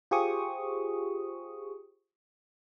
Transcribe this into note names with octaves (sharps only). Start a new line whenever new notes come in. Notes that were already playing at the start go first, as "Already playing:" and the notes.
F4 G4 G#4 C5 C#6 D#6